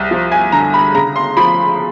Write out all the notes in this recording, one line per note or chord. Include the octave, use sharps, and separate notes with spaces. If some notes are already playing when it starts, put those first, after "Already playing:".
Already playing: C2
F3
G#5
D3 A#5
B5
C#3 A#5
C6
F3 B5